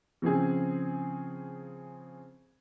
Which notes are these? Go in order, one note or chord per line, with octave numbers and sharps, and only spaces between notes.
C#3 F3 C4 G#4